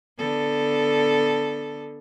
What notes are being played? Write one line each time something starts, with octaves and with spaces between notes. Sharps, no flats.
D3 B3 A4